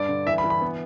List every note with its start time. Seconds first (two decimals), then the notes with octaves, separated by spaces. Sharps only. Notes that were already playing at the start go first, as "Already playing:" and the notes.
Already playing: G2 D5
0.08 D3
0.26 E3 E5
0.38 B5
0.44 E3
0.50 B5
0.62 B3